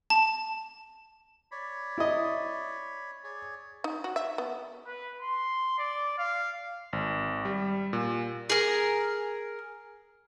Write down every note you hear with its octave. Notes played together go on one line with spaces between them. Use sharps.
A5
C#5 D5 B5
E4 D#5
G#4 C#5 D5
D#4
F#4
E5
B3
B4
C6
D5
F5
G#1
G3
A#2
G#4 A#4